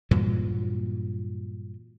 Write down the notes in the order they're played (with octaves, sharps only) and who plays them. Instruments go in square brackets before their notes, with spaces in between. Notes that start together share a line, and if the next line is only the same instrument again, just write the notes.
[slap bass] G2 A#2 E3 F#3